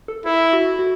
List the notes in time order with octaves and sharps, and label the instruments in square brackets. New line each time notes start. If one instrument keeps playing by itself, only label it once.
[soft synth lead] A4
[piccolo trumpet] E4 [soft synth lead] A4
[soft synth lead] F#4
F#4